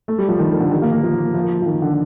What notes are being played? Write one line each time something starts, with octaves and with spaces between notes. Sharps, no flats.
A3
G3
F3
D#3
D#3
D3
D#3
A#3
A#3
F3
F3
F3
D#3
D3